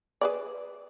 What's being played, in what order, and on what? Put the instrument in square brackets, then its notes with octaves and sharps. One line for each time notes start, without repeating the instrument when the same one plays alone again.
[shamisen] G#4 B4 D5